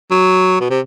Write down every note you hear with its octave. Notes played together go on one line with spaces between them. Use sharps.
F#3
B2
C3